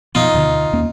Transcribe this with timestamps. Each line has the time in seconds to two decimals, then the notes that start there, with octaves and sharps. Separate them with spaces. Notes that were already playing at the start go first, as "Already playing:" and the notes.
0.15 B2 F3 B3 D#4 F4
0.34 D2 B2 D3
0.73 D#2 A#3 C#4